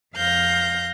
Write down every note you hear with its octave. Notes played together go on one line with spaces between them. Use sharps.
F2 F5 F6 G6 A#6